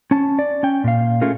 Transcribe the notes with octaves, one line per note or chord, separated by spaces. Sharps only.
C#4 A5
D5
C#4 G5
A#2 F5
A3 C#4 F4 G#4 A#4